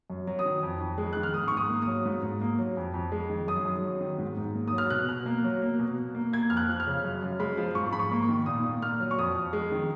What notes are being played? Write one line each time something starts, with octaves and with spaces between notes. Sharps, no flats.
F#2
F#3
D#6
D#3
F2
F2
G#3
D#3 F#6
F6
G#2 D#6
G#2 C#6
D#6
A#3
D#6
F#3
G#2
G#2
A#3
F#3
F2
F2
G#3
D#3
F#2 D#6
F#2
F#3
D#3
G#2
G#2
A#3
F#3 D#6
F6
B2 F#6
B2
A#3
F#3
A#3
B2
B2
A#3
A#3 G#6
F2 F6
F#6
F3
F6
C#3
F#2
F#2
G#3 B5
F3
G#2 C#6
G#2 B5
C#6
A#3
C#6
D#3
A#2 D#6
A#2
A#3 F6
F#3
C#6
F2 D#6
F2
G#3
D#3